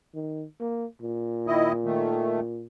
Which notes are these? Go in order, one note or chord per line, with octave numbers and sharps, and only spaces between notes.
D#3
A#3
A#2
D#3 E4 D#5
D#3 A3